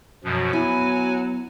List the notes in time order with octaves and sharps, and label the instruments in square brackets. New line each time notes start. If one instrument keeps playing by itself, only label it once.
[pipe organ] F#2 B2 F3 [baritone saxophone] F#3
[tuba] B3 [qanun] E4 [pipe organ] G#5